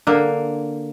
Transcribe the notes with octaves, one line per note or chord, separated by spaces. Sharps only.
D3 A#3